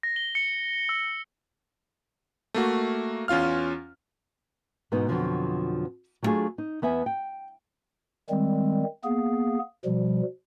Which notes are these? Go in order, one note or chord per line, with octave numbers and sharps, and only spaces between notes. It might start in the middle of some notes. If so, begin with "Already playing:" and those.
A#6
G7
C#7
E6
A3 A#3 F#4
E2 C#4 F4 F5 F6
G#2 B2 E3 B3 D#4
F2 G#2 B2 D3 F3 F#3
F#3 G3 A3 D4 F4 G#4
D#4
E2 B3 E5 G#5
G5
D#3 G3 G#3 C4
A#3 B3 G#4
B2 F3 G3